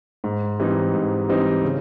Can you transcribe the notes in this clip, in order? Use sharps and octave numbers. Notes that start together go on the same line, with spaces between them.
G#2
E3 G3 C4 D#4
G#2
E3 G3 C4 D#4
C#3